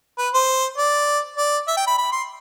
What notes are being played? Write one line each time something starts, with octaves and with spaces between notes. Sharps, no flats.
B4
C5
D5
D5
E5
G5
B5
B5
C6